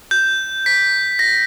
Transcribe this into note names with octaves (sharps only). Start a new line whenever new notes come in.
G6
B6
A#6